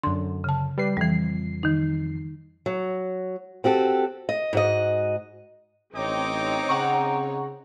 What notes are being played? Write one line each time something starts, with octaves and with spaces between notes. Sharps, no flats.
F#2 D3 C6
C#3 A5
G3 B4 C7
F2 E3 G3 C7
D#3 D#4
F#3
C4 F#4 G4 A4
D#5
G#2 F#4 D#5
A1 C4 D#4 C#5 D#5 G5 D6
C#3 F#5 A#5 C#6